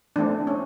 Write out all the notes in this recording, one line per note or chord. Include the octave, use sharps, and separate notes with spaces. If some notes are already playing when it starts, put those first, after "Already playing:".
E3 A3 C4 D4
C#4